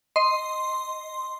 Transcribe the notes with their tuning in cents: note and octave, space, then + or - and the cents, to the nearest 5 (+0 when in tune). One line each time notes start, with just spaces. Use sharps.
D#5 +0 C6 +0